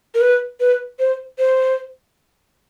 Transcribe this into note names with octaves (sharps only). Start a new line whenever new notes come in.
A#4
B4
B4
C5
C5